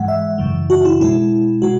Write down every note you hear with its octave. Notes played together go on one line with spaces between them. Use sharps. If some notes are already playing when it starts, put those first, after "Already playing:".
Already playing: G#2 E3 G#3 F#5
E5
F#2 C#3 E3
F#4
E4
B2 G#3 E4
B2 G#3 F#4